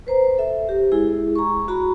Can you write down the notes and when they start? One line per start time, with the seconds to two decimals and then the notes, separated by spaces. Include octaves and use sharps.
0.07 B4 C5 A#5
0.38 A4 E5
0.69 G4
0.92 G#3 E4 G#4
1.36 A#5 C#6
1.68 F#4 A#5 B5